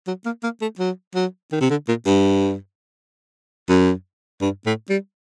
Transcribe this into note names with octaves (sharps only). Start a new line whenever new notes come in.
F#3
A#3
A#3
A3
F#3
F#3
D#3
C3
D3
A#2
G2
F#2
G2
A2
G3